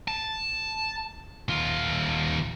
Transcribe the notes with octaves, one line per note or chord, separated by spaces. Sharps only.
A5
D#2 F4